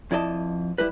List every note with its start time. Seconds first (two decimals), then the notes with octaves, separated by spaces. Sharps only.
0.11 F2 E4 D5 D#5 A5
0.78 G3 E4 B4